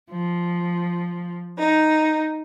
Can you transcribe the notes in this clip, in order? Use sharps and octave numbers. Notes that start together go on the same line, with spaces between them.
F3
D#4